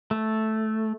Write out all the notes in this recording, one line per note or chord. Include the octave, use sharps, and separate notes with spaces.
A3